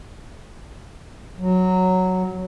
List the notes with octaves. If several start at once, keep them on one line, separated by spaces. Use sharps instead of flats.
F#3